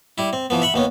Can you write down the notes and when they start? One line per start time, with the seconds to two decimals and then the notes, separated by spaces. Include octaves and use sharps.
0.18 G3 E4
0.33 C4
0.50 E3 F3 B3
0.62 E5 F#5 B5
0.74 D#2 B3 C#4